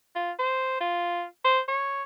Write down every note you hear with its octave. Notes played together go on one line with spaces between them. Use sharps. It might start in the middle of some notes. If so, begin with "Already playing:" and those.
F4
C5
F4
C5
C#5